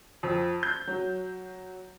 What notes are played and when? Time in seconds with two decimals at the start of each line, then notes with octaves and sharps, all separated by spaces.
0.23 F2
0.63 G6
0.87 F#3